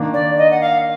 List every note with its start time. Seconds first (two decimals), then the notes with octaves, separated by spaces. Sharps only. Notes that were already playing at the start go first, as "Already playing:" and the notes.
Already playing: D#3 A#3 D4
0.14 D5
0.38 D#5
0.51 F#5
0.61 F5